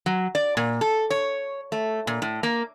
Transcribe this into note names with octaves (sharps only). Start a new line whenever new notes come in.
F#3
D5
A#2
A4
C#5
A3
A#2
A2
A#3